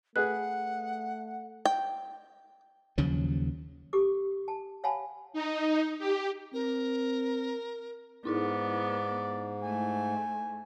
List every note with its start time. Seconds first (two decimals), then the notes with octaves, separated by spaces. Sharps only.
0.16 A3 G#4 B4 F#5 F#6
1.65 G5
2.98 D#2 C#3 F3 F#3
3.93 G4 A4 D6
4.48 A5
4.84 C#5 F5 F#5 G#5 A5 B5
5.33 D#4
5.99 G4
6.54 C4 A#4
8.25 G#2 B3 D#4 E4 G#4 D5
9.62 A3 G#5